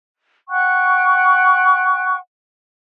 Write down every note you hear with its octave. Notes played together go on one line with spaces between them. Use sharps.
F#5 G5 C#6 F#6